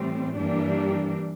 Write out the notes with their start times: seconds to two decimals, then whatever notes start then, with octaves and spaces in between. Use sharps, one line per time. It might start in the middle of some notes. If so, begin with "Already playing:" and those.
Already playing: A2 E3 G3 C4
0.36 G2 E3 G3 A#3 D4